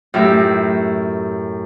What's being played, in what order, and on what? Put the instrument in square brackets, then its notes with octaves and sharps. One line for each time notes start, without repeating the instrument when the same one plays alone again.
[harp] F#2 A2 G4 E5